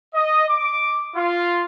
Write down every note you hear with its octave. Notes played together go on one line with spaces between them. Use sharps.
D#5
D6
F4